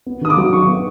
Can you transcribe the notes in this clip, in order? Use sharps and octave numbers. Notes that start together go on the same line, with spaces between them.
B3
D#3 D#6
D6
F#3
D#3 C#6
B3